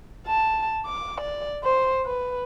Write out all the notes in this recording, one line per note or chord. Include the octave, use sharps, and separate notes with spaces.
A5
D6
D5
C5
B4